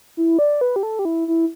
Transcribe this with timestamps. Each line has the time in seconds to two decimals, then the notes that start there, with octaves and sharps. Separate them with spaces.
0.17 E4
0.39 D5
0.61 B4
0.76 G4
0.83 A4
0.99 G4
1.05 E4
1.28 E4